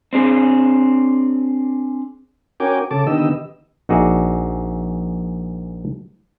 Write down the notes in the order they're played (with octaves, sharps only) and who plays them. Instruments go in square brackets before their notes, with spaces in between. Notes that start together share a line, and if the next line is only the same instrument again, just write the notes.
[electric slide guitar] C4 D4 G#4
[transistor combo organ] C#4 F#4 A#4 G5 G#5 D6
C#3 A4 A5 D6
D3 D#3 B3 G4 D#5 E6
[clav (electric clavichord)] A#1 D#4 F#4 G#4 D5 E5